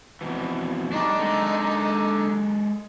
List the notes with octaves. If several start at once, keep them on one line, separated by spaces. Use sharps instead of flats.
F2 B2 E3
G3 A3 D4 D#4
D3 G#3 A4 D#5